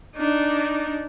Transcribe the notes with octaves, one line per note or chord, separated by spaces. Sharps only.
D4 D#4